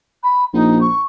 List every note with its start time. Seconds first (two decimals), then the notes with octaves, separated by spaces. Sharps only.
0.23 B5
0.53 A#1 D#4
0.81 C#6